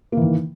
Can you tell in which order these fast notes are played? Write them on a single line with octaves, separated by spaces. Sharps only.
A#3 E3 D#3